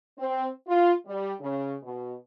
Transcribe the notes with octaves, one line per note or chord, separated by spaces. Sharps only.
C4
F4
G3
C#3
B2